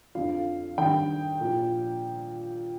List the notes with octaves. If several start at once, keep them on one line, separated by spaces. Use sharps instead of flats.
F2 D3 F3 F5
G2 D#3 G5
A#2 F3